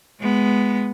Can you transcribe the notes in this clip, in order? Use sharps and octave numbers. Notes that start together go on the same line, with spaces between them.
G#3 B3